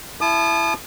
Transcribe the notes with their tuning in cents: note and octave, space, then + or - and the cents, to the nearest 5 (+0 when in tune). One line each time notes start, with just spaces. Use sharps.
E4 +15 A5 -30 D#6 -40